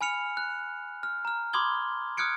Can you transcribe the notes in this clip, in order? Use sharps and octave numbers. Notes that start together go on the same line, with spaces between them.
G#5 B5 F6 C#7 F7
F#6
F6
A#5 F6
B5 C6 D6 D#6 G#6 G7
D#6 F6 F#6 G#6 C#7 D7